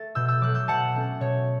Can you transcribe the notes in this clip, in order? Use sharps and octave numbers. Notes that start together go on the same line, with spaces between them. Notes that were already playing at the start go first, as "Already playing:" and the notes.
Already playing: A3 A6
B2 E6 G6
E6 G6
F#3 A3 D6 F#6
E6 G6
B2 F#5 A5
A3 C#4
B2 C#5